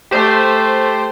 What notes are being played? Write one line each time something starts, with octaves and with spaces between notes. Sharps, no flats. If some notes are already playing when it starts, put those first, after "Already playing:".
A3 G4 C5